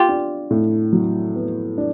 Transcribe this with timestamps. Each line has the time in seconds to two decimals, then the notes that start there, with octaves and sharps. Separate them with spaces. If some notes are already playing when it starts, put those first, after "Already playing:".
Already playing: B3 F4 G4
0.09 D4
0.51 A2
0.93 F#3
1.35 B3
1.78 D4